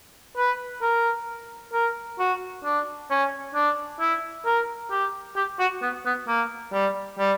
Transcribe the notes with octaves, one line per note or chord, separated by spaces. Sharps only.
B4
A#4
A#4
F#4
D4
C#4
D4
E4
A#4
G4
G4
F#4
B3
B3
A#3
G3
G3